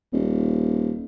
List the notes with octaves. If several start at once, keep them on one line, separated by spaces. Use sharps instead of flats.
D#1